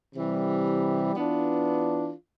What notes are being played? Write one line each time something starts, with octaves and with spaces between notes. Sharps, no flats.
C3 E3 G3
E3 B3 D4 F4